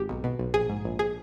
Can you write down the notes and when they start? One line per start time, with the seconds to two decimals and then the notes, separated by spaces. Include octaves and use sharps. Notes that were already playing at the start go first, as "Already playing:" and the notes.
Already playing: G#1 G4
0.09 B1
0.24 B2
0.39 B1
0.54 A#1 G#4
0.70 G#2
0.85 A#1
0.99 G#4